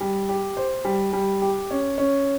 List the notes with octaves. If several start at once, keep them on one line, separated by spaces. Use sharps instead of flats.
G3
G4
C5
G3
G3
G4
C#4
C#4